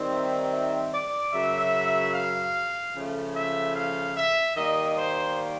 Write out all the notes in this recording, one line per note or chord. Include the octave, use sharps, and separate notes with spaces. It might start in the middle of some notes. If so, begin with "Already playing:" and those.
Already playing: D#3 G3 C4 D#4
E5
E5
D5
F#2 C#3 F#3 E5
F5
C#3 F3 A3
E5
F5
E5
D#3 G3 A#3 D#5
C5